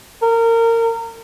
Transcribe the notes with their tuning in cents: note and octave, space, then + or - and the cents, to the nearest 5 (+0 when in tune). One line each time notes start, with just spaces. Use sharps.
A#4 -25